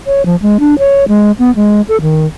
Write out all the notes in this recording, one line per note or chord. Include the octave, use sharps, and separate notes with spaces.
C#5
F3
G#3
D4
C#5
G#3
B3
G#3
A4
D#3